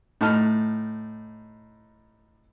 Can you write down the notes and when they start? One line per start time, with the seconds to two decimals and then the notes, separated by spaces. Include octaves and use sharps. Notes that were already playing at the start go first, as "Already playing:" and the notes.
0.21 A2 D#4 A5 F6